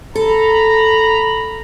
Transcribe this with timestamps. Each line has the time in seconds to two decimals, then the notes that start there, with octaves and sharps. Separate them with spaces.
0.15 A4 A#5 B5